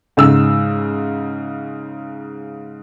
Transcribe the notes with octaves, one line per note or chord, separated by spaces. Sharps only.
G#2 C#3 E6